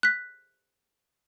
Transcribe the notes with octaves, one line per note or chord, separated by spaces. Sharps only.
F#6 B6